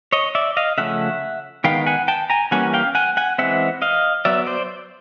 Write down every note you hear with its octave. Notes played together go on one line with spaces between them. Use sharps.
C#5 D#5
D5 E5
D#5 F5
C#3 F3 A3 C#4 E5 F#5
D#3 G#3 B3 F5 G5
F#5 G#5
G5 A5
G#5 A#5
E3 G3 A#3 C#4 F#5 G#5
F5 G5
F#5 G#5
F#5 G#5
E3 G#3 C4 E5 F#5
D#5 F5
F#3 B3 D5 E5
C5 D5